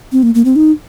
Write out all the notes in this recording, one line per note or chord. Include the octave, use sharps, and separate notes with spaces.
C4
A#3
A#3
C4
D#4